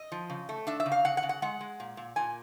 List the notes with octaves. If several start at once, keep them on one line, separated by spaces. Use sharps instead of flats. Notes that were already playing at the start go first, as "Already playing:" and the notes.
Already playing: D#5
F3
C#3
A3
D4 E5
E5
C#3
F5
C#3 F#5
F#5
C#3
F#5
G#3 F#5
G#3
A#2
A#2
A#2 G#5